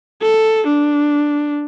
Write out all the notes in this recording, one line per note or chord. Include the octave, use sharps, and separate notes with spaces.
A4
D4